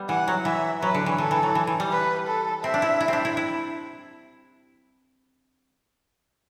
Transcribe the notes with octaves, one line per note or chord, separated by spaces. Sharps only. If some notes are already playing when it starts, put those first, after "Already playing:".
Already playing: G3 B3
E3 F#5
F#3
E3 E5
F#3 B4
D3
E3
E3 A4
E3
F#3
E3
E3
G3
B4
A4
C4 E5
D4
E4
E4
C4 D4
E4
E4